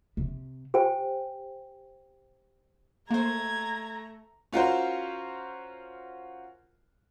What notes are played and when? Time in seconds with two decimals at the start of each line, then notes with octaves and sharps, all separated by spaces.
0.17 C3
0.74 G4 C5 G5 G#5
3.11 A3 A#3 C5 A#5 G#6
4.53 C#4 F4 F#4 A#4 C5